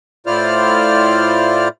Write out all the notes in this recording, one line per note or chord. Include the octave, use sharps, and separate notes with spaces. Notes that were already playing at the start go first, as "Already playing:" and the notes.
A2 E4 F4 C5 D5 F6